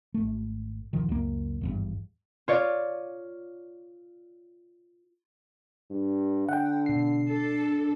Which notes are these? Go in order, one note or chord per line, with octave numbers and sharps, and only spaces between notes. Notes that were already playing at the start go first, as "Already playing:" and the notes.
G#1 A3
D#1 D#3 F3
C#2 F#2 A#3
G#1 E2 G2
F4 C#5 D5
G2
D3 F#5 G5
B2 C7
D4 A4